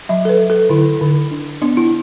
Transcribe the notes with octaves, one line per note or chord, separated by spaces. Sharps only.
F#3 E5
A4
B4
F#3
A4
D3 E4
D3
D4
B3 D4
E4